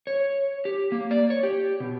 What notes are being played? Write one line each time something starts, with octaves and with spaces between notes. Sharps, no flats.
C#5
G4
A#3
D5
C#5
G4
B2